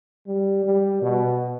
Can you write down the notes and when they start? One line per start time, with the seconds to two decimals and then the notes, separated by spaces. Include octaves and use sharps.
0.26 G3
0.64 G3
1.02 B2